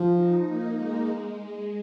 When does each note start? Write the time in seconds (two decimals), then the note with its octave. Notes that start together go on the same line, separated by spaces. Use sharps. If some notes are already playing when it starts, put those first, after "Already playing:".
Already playing: F3
0.14 D#4
0.44 A#3
0.75 G#3
1.06 G#3